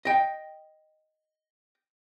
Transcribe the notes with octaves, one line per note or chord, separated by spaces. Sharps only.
D#5 G5